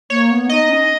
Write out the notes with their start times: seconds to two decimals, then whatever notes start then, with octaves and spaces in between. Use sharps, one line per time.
0.10 A#3 C#5
0.31 B3
0.49 D#4 D#5
0.69 C#4